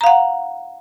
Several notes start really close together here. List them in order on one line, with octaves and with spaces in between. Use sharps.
A#5 F5 F#5